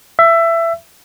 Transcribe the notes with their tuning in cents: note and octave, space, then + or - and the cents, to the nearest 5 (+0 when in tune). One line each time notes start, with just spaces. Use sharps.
E5 +20